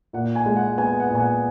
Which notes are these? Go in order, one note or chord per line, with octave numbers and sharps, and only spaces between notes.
A#2 F#5
G#5
G#3
F#5
B3 G#5
F#5
A#2
G#5
F#5